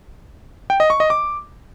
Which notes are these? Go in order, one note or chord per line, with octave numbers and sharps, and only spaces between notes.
G5
D#5
C#6
D#5
D6